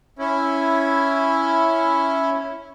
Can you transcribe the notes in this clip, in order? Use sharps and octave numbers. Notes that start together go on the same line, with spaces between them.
C#4 E4